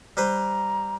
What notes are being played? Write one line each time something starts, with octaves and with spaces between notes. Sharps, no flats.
G3 B4 C5 A#5